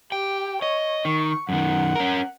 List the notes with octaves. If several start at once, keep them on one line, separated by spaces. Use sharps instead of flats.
G4 G5
C#5 D#5
D#3 C#6
F#2 D#3 F#5
C#4 A#4